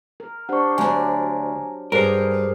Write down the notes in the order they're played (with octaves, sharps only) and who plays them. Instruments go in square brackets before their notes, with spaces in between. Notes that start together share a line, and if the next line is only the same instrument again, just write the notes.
[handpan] A#4
[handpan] D4 G4 C5 [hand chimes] F#5 C#6
[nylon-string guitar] D2 D4 [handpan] F#3 [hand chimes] G#5 A#5
[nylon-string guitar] G2 [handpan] G4 G#4 [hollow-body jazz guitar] A#4 [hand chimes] C5 F6 C7